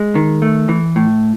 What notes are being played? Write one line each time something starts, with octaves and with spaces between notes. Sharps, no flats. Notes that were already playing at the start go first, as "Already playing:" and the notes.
Already playing: G#3
D#3
A3
E3
A2